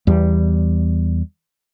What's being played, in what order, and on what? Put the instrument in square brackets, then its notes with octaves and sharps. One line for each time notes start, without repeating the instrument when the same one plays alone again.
[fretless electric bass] E2 G3